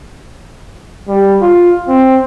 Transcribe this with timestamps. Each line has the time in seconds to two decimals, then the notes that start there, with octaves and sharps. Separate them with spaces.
1.08 G3
1.42 F4
1.88 C4